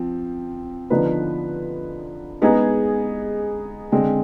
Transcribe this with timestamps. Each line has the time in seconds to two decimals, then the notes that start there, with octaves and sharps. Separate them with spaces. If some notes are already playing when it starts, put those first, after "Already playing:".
Already playing: F3 C4
0.90 D3 F3 B3 D#4 B4
2.42 G#3 B3 D#4 G#4
3.92 D3 G#3 C4